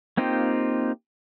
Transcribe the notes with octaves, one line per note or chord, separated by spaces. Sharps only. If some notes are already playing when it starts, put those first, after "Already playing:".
A#3 C4 D#4 F4 G4